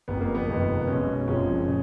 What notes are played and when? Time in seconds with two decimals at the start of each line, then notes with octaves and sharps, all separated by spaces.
0.08 F#1 F2 F3 B3
0.21 A#3
0.35 B3
0.47 F1 F2 D#3 G#3
0.87 B1 B2 G#3 C#4
1.27 F#1 F2 F3 G#3 C#4
1.68 C#3